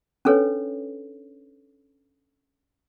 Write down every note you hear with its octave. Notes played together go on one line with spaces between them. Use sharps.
C#4 D4 A4 B4 C#5